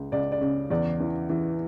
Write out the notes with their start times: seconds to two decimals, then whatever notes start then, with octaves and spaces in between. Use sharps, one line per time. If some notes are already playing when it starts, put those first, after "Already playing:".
Already playing: C#2
0.12 C#2 D5
0.32 D5
0.41 C#3
0.70 E2 D5
1.00 E3
1.30 E3